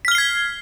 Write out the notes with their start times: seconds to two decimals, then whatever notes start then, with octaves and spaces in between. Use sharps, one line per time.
0.05 B6
0.08 F6
0.12 G7
0.15 C7
0.18 G#6